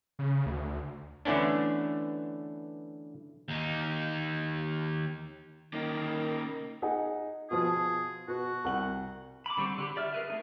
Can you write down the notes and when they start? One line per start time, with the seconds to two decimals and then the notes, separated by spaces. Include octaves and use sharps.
0.19 C#3
0.46 D2
1.25 D3 E3 A3 B3 C#4 D4
3.48 D#2 D#4
5.73 D#3 A#3 C#4
6.82 D#4 G#4 F#5
7.51 B2 F3 G#4
8.28 B2 F#4
8.65 C2 F#5 F#7
9.46 B5 D6
9.57 D3 G3 C4 C#6
9.78 D3 G4 B5
9.96 G4 D5 E5 F6
10.13 G#4 A#4 B4 E5
10.28 A3 D#4 G#4